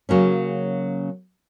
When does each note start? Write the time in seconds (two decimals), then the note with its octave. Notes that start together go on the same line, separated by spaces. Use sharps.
0.09 C#3 F#3 A#3 C#4